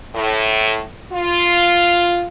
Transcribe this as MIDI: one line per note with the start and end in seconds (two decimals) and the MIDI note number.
0.15 0.81 45
1.12 2.28 65